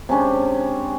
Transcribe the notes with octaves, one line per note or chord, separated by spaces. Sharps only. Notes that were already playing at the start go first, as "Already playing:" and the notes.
C3 G#3 C#4 D4